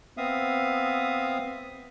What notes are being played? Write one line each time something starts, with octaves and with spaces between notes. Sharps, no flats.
B3 C4 E5 F5 D#6